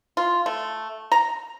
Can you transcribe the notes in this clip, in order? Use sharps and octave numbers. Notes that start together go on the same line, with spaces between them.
F4
A3
A#5